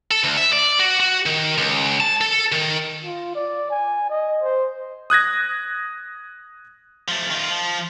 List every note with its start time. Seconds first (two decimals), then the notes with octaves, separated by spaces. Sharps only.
0.11 A4
0.24 D2
0.37 E5
0.53 D5
0.79 F#4
1.00 F#4
1.26 D#3
1.58 C#2
2.00 A5
2.21 A4
2.52 D#3
3.04 F4
3.35 D5
3.71 G#5
4.09 D#5
4.42 C5
5.10 D#6 F#6 G#6 A#6
7.08 F3 A3
7.30 D#3 F4
7.51 F3